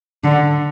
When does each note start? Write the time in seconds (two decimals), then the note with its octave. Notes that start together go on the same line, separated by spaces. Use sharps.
0.24 D3